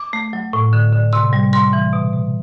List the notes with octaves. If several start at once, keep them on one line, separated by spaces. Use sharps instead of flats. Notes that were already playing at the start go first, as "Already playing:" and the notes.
Already playing: D6
A3
F#3
A2
D3
D3
C3 C6
G3
G3 C6
E3
B2
B2